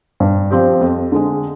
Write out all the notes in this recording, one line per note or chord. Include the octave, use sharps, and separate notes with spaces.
G2
F3 C4 G4
F2
D3 G#3